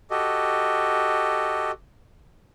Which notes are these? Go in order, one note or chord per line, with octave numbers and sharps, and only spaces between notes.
F#4 G4 A4 D#5